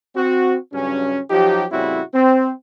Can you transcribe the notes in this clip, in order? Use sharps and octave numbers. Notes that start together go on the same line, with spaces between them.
C4 F#4
G2 C#3 F#3 C#4
F3 F#3 D#4 G4
A2 C#3 G3 C4 E4 F#4
C4